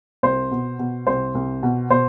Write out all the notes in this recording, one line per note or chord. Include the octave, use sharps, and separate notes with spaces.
C2 C5
B2
B2
C2 C5
C2
B2
B2 C5